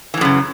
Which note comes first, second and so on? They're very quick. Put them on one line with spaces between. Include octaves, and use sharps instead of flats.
E3 A2 F#2 C#3